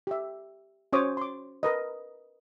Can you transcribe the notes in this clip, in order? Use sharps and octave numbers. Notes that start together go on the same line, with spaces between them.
G4 E5
C#4 F#4 C5 C#5 D6 D#6
C6 D6
A#4 B4 D#5